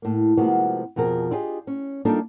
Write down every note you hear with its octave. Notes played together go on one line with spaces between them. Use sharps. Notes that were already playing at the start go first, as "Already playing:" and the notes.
A2 A#3
C3 F3 G#3 A#3 B3 F#4
F2 B2 F3 G#4 A#4
D4 E4 F4 G4 G#4 D#5
C#4
G3 A#3 D4 D#4 F4 A4